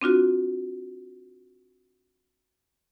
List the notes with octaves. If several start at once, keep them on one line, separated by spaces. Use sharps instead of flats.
C4 D4 F4 F#4